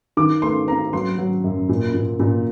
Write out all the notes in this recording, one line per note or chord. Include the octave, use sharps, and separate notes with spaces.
D#3 D6
A3 C6
C4 A#5
F#3 C6
F#3
F#2
A#2
A#2
A#2